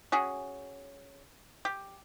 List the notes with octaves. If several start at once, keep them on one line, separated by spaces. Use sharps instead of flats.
C#4 F#4 G#4
G4